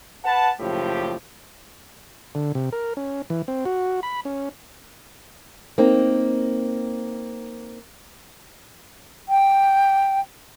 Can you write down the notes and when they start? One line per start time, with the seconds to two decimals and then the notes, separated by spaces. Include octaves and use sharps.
0.24 B4 F#5 A5
0.60 F#1 A2 F3 G4
2.35 D3
2.55 C3
2.72 A#4
2.97 C#4
3.30 E3
3.48 C4
3.65 F#4
4.03 B5
4.25 C#4
5.78 A#3 C4 D#4
9.29 G5